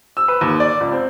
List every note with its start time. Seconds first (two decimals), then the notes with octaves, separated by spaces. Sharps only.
0.17 E6
0.28 B4
0.41 D#2
0.60 D5
0.80 C#2
0.92 C4